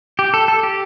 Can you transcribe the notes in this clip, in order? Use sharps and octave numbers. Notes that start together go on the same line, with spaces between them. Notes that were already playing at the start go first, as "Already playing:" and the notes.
G4
A4
A4
G4